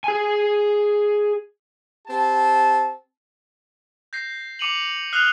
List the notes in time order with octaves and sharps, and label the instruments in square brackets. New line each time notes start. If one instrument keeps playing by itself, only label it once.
[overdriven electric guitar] G#4 G#5
[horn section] C4 G4 A5
[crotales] G6 A#6 C7
D6 C#7 D#7 F7 F#7
D#6 F6 F#6 C7 F7 G7